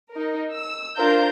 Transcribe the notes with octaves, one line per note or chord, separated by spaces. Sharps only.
D#4 A#4
E6
D4 F4 A#4 C5 F5 G6